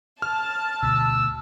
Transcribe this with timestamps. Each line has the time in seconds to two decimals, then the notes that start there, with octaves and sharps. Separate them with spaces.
0.22 A5 F6
0.83 D2 B2 E6